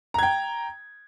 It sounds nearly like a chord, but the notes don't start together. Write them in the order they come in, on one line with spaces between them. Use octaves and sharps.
A#5 G#6 G5